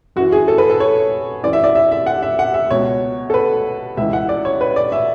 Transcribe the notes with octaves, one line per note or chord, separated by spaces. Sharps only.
F#2 E3 F#4
G#4
A4
B4
A4
C#5
F#2 E3 D5
E5
D5
E5
E5
F#5
E5
F#5
E5
C#2 B2 C#5
A4
B4
C#2 C#3 E3 E5
F#5
D5
C#5
B4
D5
E5